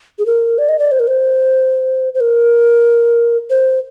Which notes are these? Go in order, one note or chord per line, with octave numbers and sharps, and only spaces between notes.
G#4
A#4
D5
D#5
D5
C5
A#4
C5
C5
A#4
C5